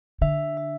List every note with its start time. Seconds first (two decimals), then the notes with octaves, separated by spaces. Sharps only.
0.21 D3 E5
0.57 E5